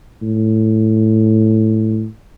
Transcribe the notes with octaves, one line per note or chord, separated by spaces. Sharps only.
A2